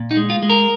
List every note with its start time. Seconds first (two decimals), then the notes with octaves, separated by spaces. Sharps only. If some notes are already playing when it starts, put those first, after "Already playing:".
Already playing: A#2
0.11 D#4
0.17 G#3
0.30 F4
0.43 G#3
0.50 A#4